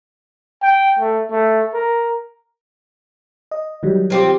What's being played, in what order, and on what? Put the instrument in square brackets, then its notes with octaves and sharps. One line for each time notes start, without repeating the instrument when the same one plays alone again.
[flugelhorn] G5
A3
A3
A#4
[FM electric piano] D#5
D#3 F#3 G3
[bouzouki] F3 C4 G4